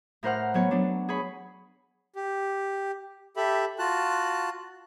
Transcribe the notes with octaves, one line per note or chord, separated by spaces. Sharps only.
A2 A#4 C5 F#5 F6
F#3 B3 C#5
F#3 B3 D4
G#4 C#5 B5
G4
G4 A4 E5 B5
F4 F#4 A5 F#6